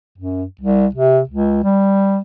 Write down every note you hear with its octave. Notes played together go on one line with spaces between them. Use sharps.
F#2
C2
C3
C#2
G3